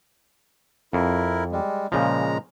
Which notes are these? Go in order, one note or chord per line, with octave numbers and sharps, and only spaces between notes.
F2 E4 A#4
G3 G#3
A#2 C#3 F3 G#3 A#5